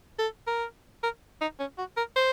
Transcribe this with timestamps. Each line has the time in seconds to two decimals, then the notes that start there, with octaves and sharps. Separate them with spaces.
0.19 A4
0.47 A#4
1.03 A#4
1.41 D#4
1.59 C#4
1.78 F#4
1.97 A#4
2.16 C5